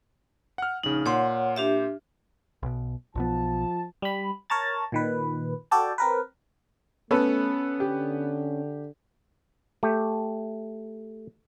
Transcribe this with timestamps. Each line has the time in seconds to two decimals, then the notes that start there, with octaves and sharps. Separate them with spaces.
0.58 F#5 F6
0.83 A#1 C#3 D#4
1.06 A#2 C#5 F#5 C6
1.56 D4 G4 E5
2.63 B1 B2
3.15 B1 B2 F3 B3 A5
4.02 G3 B5
4.50 A#4 C#5 A5 A#5 A6
4.92 A#2 D#3 B4
5.71 F#4 A4 D5 G5 A5
5.98 C4 A#4 B4
7.11 A3 B3 C#4 A4 B4
7.80 D3 G4
9.83 A3 G4